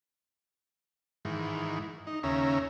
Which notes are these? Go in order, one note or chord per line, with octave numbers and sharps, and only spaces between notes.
G#2 D#3 E3
D#4
D#2 C#3 C#4 E5 A#5